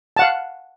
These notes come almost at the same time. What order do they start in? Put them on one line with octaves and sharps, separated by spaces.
A5 F#5 F5